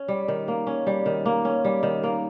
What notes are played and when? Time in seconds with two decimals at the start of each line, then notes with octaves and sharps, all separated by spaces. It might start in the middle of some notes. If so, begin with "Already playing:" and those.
Already playing: C#4
0.08 G3
0.28 D#3
0.48 A#3
0.67 C#4
0.87 G3
1.06 D#3
1.26 A#3
1.45 C#4
1.65 G3
1.83 D#3
2.03 A#3